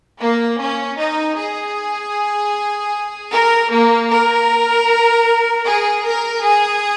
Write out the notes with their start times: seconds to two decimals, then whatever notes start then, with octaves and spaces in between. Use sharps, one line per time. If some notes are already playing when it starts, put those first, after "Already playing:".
0.20 A#3
0.59 C#4
0.98 D#4
1.36 G#4
3.32 A#4
3.70 A#3
4.10 A#4
5.66 G#4
6.05 A#4
6.43 G#4